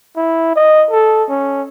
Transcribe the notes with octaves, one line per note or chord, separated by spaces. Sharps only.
E4
D#5
A4
C#4